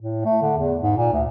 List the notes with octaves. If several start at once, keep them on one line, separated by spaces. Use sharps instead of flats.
A2
A3
D3
E2
G#2
A#2
D2